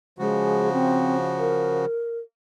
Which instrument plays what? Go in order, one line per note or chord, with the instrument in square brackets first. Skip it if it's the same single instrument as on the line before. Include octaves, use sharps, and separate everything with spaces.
[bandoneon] C#3 F3 F#4 [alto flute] G#3
[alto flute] C4
A#4